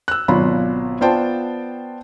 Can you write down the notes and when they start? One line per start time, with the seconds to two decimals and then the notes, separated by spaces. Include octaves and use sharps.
0.08 E6 F#6
0.28 G#1 B2 F#3 F4 B5
1.01 B3 F4 C5 D5 G5 A5